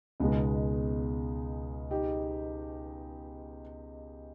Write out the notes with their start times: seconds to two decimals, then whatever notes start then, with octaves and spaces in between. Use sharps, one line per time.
0.20 C#2 B2 G#3 B3 D#4
1.91 D#4 G4